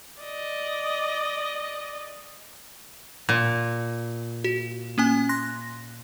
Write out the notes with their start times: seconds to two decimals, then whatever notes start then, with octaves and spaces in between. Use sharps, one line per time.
0.21 D5 D#5
3.29 A#2
4.44 F#4
4.98 A#3 C#4 G#5
5.29 C6 F#6 A#6